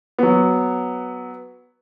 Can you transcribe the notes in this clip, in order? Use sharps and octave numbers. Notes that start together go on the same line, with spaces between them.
F#3 B3